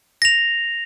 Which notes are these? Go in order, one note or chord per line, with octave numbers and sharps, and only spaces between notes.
A#6 F7